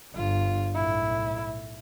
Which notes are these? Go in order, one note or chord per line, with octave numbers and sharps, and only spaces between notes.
G1 G2 F4
B1 A2 E4